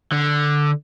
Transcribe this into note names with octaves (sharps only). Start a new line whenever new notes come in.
D3